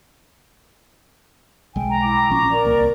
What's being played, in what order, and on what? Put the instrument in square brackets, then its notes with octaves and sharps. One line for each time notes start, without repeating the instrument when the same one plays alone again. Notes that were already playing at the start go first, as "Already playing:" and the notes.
[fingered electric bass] B1 G#3 [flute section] G5 G#5
[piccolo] A#5
[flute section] E4 G5 D6
[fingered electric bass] A#1 F3 C#4 [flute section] C#6 D6
[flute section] A#4 D5
[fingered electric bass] D1 C2 A#3